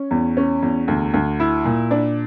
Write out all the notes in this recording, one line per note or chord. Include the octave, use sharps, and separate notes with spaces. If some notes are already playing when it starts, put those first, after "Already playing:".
Already playing: C#4
E2
C#4
E2
D2
D2
E4
A#2
D4